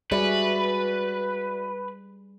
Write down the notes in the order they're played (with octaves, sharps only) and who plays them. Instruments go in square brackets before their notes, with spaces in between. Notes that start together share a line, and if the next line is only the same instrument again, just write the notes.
[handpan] G3 G#4 [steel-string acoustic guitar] F#4 D5 E5 [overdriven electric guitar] B4